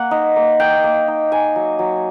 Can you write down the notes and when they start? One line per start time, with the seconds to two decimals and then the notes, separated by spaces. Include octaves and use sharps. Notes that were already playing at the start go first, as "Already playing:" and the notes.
Already playing: A#3 F#5
0.11 D#4
0.36 A#3
0.60 D#4 G5
0.84 A#3
1.08 D#4
1.32 D#4 G#5
1.56 F#3
1.79 F#3